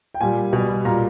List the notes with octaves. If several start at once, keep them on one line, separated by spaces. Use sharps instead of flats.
G5
A#2 G3 G#5
B2 G3
A#2 G3 A#5